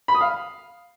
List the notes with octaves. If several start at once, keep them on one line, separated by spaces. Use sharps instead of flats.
B5
D#6
F5